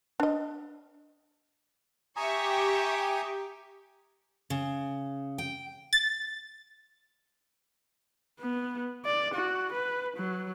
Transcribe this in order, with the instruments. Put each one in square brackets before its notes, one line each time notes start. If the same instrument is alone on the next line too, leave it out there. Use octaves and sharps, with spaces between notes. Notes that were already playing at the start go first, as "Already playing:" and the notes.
[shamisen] D4 D#5
[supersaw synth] G4 [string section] E5 C#6 [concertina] G#5 A#5 D#6
[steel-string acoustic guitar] C#3
G5
[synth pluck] A6
[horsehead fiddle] B3
D5
F#4
B4
F#3